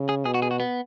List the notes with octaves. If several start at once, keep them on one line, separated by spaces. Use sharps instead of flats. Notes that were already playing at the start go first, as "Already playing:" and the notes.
Already playing: C#3
G#4
B2 G#4
F#4
G#4
F#4
B3